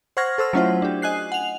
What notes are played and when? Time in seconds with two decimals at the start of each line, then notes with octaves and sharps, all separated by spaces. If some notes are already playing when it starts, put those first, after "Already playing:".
0.17 C5 F#5 C#6 F6 G#6 A#6
0.38 A4 C5 E6 F6
0.53 F#3 A3 C#4 E4 F4 C5
0.82 D4 G4
1.02 D#5 G#5 F#6 C7
1.32 F#5 F7